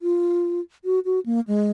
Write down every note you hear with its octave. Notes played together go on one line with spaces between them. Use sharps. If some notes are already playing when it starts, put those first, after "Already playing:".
F4
F#4
F#4
A#3
G#3